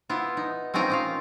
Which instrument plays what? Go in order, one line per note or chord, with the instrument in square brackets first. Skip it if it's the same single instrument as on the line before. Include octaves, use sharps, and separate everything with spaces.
[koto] B3 E4 F4
D#4
C4 C#4 D#4 F4 A#4 D#5
D#4 F4 F5